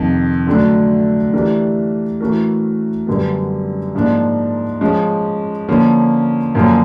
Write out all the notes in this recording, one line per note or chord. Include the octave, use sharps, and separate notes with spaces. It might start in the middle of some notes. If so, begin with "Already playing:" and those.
Already playing: F2 C3 D#3
D3 F#3 A3 D4
E3 A3 D4 G4 A#4
E3 A3 C#4 F#4 A#4
F#2 D3 G3 B3
G#2 F3 A#3 D4
F3 G#3 C#4
D3 F3 A#3 C#4
F#2 D3 F3 A#3 C#4